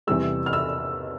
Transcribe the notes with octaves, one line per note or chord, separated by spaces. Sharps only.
E2 C3 E3 G3 E6
F6
E6